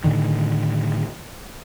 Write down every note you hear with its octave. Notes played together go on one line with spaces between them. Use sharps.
A2 D3 D#3